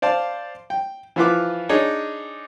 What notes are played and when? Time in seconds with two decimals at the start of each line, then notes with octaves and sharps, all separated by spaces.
0.02 C5 D5 F5 A5
0.70 G5
1.16 E3 F3 F4 B4 F5 D6
1.69 D4 D#4 G#4 C#5